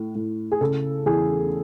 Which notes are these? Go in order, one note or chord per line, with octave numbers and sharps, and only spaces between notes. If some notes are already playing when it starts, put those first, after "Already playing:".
Already playing: A2
A2
G#4
C#3 A4
E2 G#4